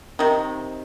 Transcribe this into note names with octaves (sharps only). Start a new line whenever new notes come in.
C3 D#3